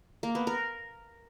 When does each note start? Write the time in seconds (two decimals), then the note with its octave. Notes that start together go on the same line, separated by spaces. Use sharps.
0.23 A#3
0.35 B3
0.47 A#4